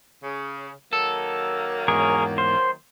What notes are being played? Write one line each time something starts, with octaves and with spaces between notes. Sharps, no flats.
C#3
D#3 F#3 A#3 A4
E2 G#2 G#4 A#4 C#5
C5